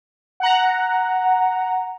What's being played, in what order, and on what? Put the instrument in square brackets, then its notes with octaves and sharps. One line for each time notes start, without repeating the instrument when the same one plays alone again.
[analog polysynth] F#5 A#5